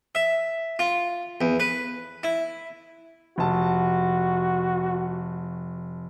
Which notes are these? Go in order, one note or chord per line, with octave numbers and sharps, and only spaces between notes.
E5
F4
E2
B4
E4
F1 F#4 A5